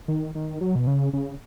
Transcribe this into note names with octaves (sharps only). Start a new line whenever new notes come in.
D#3
D#3
F#3
B2
C#3
C#3